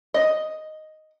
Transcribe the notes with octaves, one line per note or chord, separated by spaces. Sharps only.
D#5